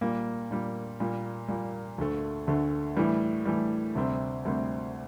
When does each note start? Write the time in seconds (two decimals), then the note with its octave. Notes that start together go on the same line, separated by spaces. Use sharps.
0.01 A#2 G3 A#3
0.51 A#2 G3 A#3
1.00 A#2 G3 A#3
1.48 A#2 G3 A#3
1.98 D2 D3 A3
2.47 D2 D3 A3
2.97 A2 E3 G3
3.45 A2 E3 G3
3.95 D2 C3 G3 C4
4.45 D2 C3 G3 C4